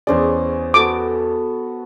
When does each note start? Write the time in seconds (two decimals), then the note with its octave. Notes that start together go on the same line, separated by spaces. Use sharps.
0.07 E2 C#4 G#4 C5 D5 C#6
0.74 B3 F#4 A4 D6